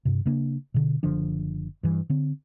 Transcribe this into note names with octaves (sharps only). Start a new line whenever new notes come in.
G2 C3
C#3 A#3 D4
B2 D3
F#1 D3 F3 D4
G2 E3
D3 C4